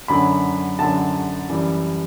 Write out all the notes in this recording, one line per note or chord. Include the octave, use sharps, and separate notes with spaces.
F#2 D3 F#3 B5
F#2 D3 F#3 A5
F#2 E3 G3